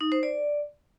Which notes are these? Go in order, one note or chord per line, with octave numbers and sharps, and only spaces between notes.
D#4
C5
D5